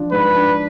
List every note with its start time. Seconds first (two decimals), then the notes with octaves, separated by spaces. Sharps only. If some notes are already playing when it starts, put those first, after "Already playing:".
Already playing: F3 D4
0.12 G#2 B4
0.35 D4